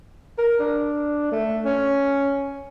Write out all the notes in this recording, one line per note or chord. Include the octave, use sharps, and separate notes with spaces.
A#4
D4
A3
C#4